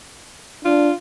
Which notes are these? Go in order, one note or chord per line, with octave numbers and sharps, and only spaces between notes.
D4 F4